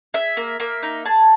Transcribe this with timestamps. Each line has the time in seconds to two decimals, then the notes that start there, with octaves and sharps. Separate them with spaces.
0.14 G#4 E5
0.37 A#3
0.60 A#3 E5
0.83 D#4
1.05 G#4 A5